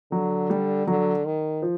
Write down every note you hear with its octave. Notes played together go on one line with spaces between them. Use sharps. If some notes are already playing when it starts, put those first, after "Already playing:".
D3 F#3
G3
D3 F#3
D#3
F3